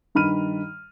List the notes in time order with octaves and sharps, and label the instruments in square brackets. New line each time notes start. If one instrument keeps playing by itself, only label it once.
[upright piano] G2 D#3 B5 F6 D#7